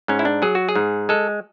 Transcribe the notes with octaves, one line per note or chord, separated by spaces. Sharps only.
G#2 C#4
E4
D4
F#3 G#4
F#4
G#4
G#2
G#3 A4